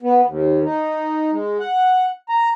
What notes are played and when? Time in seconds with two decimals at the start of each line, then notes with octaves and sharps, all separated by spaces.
0.02 B3
0.25 D#2
0.64 D#4
1.32 G#3
1.59 F#5
2.29 A#5